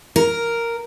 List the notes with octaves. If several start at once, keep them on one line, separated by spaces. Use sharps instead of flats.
A#4